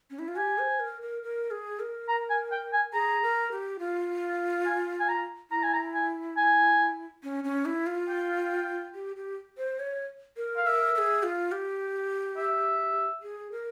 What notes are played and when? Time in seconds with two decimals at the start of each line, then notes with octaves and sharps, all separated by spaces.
0.10 C#4
0.19 E4
0.28 F4
0.37 G4 G#5
0.59 C5
0.80 A#4
1.02 A#4
1.23 A#4
1.51 G#4
1.80 A#4
2.08 A#5
2.30 G#5
2.52 G5
2.73 G#5
2.93 G#4 A#5
3.23 A#4
3.51 G4
3.79 F4
4.66 G#5
5.00 G#5
5.09 A#5
5.51 E4 A#5
5.63 G#5
5.74 A#5
5.94 G#5
6.37 G#5
7.23 C#4
7.44 C#4
7.65 E4
7.87 F4
8.09 G5
8.95 G4
9.16 G4
9.58 C5
9.80 C#5
10.37 A#4
10.57 F5
10.65 A#4 E5
10.95 A#4
10.98 G#4
11.23 F4
11.52 G4
12.37 E5
13.23 G#4
13.52 A#4